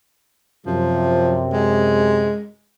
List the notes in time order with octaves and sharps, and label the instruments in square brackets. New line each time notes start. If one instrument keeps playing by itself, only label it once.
[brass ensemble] F#2 C3 [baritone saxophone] F3
[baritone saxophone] G#3